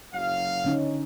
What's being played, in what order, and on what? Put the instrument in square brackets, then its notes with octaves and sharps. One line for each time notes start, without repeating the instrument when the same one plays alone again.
[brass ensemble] F#1 F#3 F5
[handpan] D3 C#4 D#4